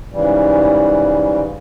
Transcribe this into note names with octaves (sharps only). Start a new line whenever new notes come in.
G#2 C#3 E3 G3